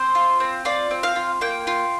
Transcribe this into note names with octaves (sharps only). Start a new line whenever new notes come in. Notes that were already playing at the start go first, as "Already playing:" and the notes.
Already playing: C4 C5
F4
C4
F4 D5
C4
F5
F4
A#3 G5
F4